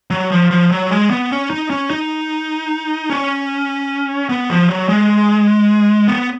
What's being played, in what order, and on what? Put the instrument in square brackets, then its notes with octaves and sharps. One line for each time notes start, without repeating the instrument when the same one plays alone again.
[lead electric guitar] F#3
F3
F3
F#3
G#3
B3
C#4
D#4
C#4
D#4
C#4
B3
F3
F#3
G#3
B3